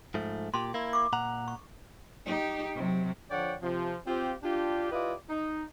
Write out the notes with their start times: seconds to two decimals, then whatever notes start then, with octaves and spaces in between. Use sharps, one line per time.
0.14 G#2 F3 A3
0.54 A#2 G4 C6
0.74 A#3 E4
0.93 C#6 D6
1.13 A#2 F#5 A#5
1.48 C#6
2.26 D#4 G4
2.75 C3 F#3
3.31 D3 F3 C#5 D5 F#5 G5
3.62 C3 F3
4.07 C4 F4 G4
4.43 D4 F4 G4
4.92 E4 F4 G4 B4 D5 D#5
5.30 D#4